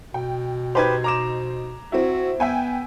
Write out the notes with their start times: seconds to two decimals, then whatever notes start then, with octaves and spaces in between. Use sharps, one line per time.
0.14 B2 G5
0.75 D#4 G4 B4 C5 G#6
1.04 A#5 D6 E7
1.92 C4 E4 F#4
2.40 B3 E5 G5 G#5